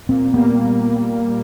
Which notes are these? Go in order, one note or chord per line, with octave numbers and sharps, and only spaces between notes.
A#2 C4
G3 A#3 B3
A#2